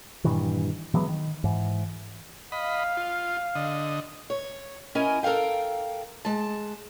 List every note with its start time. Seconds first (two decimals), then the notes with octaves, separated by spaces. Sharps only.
0.24 G2 A#2 D#3 E3
0.94 E3 F#3 G#3 B3
1.08 D#3
1.44 G#2 E3
2.52 D#5 F5 B5
2.97 F4
3.55 D3 D#5
4.30 C#5
4.95 C#4 E4 A#4 D#5 G#5
5.23 A4 A#4 C#5 F5 G5
6.25 G#3 A5